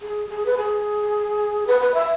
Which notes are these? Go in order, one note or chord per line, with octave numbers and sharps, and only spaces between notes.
G#4
G#4
B4
G#4
B4
B4
E5